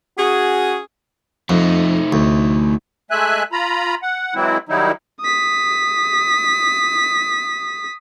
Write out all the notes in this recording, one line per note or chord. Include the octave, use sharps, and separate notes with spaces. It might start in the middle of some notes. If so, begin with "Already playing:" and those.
C#4 F#4 G#4
F2 A3 D#4
D2
G#3 A3 E5 G#5 F#6
F4 A#5 B5
F#5
E3 F#3 G#3 C4 E4
D#3 F#3 G3 D#4 E4
D#6 B6